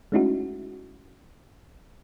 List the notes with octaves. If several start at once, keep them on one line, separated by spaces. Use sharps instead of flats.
G#3 A3 C#4 D#4 E4 F#4